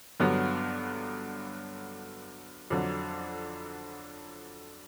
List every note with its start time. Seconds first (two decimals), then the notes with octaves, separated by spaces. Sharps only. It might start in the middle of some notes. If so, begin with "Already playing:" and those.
0.20 G2 D3 F#3 B3
2.70 F2 D3 F#3